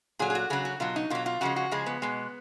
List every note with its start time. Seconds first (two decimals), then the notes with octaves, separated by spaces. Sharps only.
0.19 A#2 F#3 G#4
0.30 G#4
0.35 F#4
0.50 C#3 F#3 G#4
0.65 F#4
0.80 B2 F#3 F4
0.96 D#4
1.10 B2 F#3 F4
1.26 F4
1.41 C#3 F3 G#3 F#4
1.56 F#4
1.71 C#3 F3 G#3 G#4
1.86 B3
2.02 B2 G#3